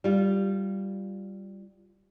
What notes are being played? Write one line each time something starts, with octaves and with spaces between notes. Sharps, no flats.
G3 F4